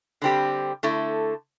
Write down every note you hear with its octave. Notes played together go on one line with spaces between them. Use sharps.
D3 G3 C4 G4
D3 A3 E4 A4